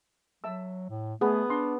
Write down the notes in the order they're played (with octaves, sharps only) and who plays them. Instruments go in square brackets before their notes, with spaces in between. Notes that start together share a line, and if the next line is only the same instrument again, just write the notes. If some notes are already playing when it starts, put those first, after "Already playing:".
[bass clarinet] F#3 [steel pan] E5 A5 E6
[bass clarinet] A2
[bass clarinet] A3 [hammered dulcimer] B3 [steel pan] G#4
[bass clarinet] D4 [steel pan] C6